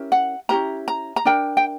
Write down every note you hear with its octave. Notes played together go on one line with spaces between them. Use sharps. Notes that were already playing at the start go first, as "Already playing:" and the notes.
Already playing: C#4 E4 G4 A#4
F#5
C#4 E4 G4 A#4 A#5
A#5
A#5
D4 A#4 G5
G5